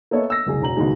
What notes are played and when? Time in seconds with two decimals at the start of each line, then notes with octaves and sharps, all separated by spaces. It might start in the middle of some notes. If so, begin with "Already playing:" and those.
0.11 A#3 B3 A4 C#5 D#5 E5
0.30 E6 A#6
0.46 F#1 C2 G#4
0.62 E1 A#5 F#7
0.77 C#2 B2 D#3 G#3